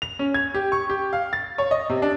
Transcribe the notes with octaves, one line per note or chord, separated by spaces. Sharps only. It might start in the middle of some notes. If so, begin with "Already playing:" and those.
F7
C#4
G#6
G4
C#6
G4
F5
A6
C#5
D#5
C3
D4